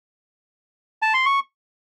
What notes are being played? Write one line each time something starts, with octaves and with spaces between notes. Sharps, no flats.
A5
C6
C#6